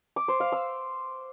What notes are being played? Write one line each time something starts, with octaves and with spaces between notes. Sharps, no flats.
D6
C5
F5
E6